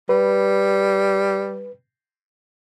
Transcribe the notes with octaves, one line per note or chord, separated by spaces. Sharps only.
G3 B4